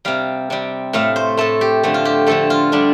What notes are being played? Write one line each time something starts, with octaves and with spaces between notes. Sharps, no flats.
C3 G3 F5
C3 G3
A2 A3 F5
C5
A2 A3 A4
G4
D3 F3 A3
F4
G4
D3 F3 A3 A4
F4
D3 G3 D4